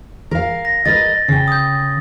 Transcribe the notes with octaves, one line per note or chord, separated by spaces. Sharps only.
A#4 F5
A#6
A#4 B4 D#5 A6
C#3 G5
D#6 G6